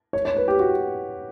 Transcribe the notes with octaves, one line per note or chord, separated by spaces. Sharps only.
C#5
C#5
B4
G4
F#4